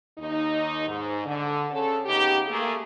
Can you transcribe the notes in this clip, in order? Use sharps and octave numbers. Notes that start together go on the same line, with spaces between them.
D#2 D#4
G#2
D3
C#3 A4
C#3 B3 D#4 G4
A3 A#3 G#4